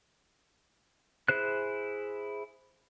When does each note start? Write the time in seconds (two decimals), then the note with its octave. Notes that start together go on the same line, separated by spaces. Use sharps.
1.28 E4 G#4 C5 F#6